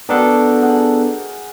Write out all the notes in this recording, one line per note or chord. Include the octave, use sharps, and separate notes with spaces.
B3 D4 F#4 G4 A4 A#4
G#4 F#5